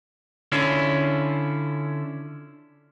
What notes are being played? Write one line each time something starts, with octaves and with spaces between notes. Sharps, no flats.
D3 C#4 E4 F4